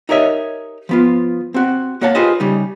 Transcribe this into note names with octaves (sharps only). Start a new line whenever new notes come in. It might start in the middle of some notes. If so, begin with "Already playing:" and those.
D#4 G4 A#4 C#5 D#5 E5
F3 B3 F4
C4 F#4
A#3 F#4 C#5 F5 A5
F4 G4 G#4 B4 C5 D#5
C#3 G3 D#4